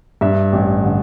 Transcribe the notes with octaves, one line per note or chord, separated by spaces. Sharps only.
G2 E5
A1
D3